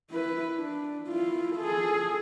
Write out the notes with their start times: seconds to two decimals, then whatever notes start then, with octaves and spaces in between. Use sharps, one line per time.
0.11 E4 B4
0.56 D4
1.08 E4 F4
1.56 G#4 A4